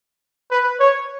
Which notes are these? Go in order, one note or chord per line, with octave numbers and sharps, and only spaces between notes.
B4
C#5